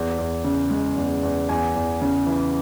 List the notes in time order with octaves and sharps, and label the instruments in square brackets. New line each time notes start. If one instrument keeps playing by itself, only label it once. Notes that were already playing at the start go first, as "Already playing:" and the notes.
Already playing: [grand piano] E2
E2
C#3
G#3
E2
E2
E2 G#5
E2
C#3
E3